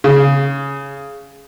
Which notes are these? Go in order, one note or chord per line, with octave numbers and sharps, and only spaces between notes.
C#3